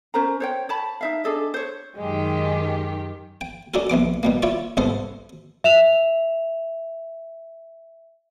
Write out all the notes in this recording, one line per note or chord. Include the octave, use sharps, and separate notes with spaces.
C#4 A#4 C5 A#5
C5 C#5 G5
C#5 A5 B5
D#4 E5 F5
D4 G#4 A4 D#5
C5 C#5
F#2 D#3 G#3 G4
G5
C#4 D4 F#4 A4 A#4
A#1 C3 B3 D6
B2 G3 A#3
E4 F4 C#5 D5
C2 G#2 B3 A4 C5
E5 E7 F7